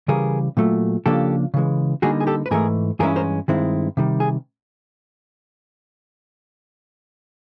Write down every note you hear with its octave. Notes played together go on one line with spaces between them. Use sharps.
C#3 E3 G3 G#4 A#4
A#2 F#3 A3
C#3 F3 A#3 D4 G4 A4
C#3 E3 G#3
D3 G3 A#3 D#4 F#4 G#4
G#4
G4 A4
B4
G#2 E3 A3 G#4 A#4
G2 E3 G#3 C#4 E4 G#4 A#4
A#4 C5
G2 D#3 G#3 C4 E4
C3 D#3 G3
G#4